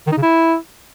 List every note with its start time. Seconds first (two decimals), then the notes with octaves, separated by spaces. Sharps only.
0.07 D#3
0.12 D#4
0.17 C#3
0.22 E4